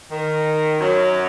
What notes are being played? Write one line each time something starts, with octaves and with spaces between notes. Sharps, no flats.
D#3
F#2 F#3